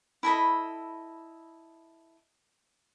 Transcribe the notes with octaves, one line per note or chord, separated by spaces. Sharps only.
E4 A4 D#5 B5